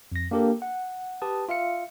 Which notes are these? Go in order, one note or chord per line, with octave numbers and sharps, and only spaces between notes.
F2 A#6
A#3 D4 G4 A4 A#4
F#5
G4 B4 A5 D#6
F4 E5 F5 C#7